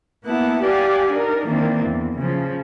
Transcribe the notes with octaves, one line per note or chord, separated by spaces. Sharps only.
A#3 B3 E4 F#5 A5
G4 D5 F5 F#5 G#5
D4 D#4 A#4
D#3 E3 A#3 C4 D4
E2
C#3 F3